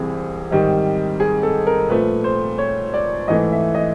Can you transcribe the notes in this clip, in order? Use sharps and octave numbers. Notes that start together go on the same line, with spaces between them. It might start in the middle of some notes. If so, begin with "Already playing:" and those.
Already playing: C2 C3 E3 G#4
G#2 D#3 G3
G#4
A4
A#4
A#2 F3 A3 B4
C5
C#5
D5
G#2 E3 A3 D#5
E5
D#5